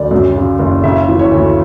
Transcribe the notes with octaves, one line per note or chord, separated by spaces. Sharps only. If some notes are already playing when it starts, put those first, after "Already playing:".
Already playing: D2 D5
F#2
C#3
F#1
C#3 E5
E3
C#5
D2